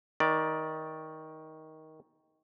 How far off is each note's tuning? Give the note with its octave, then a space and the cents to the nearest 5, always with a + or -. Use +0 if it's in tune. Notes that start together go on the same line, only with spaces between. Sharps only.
D#3 +15 D5 +0